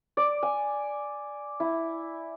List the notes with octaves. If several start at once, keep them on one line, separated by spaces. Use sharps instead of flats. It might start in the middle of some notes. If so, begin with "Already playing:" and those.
D5
G#5
E4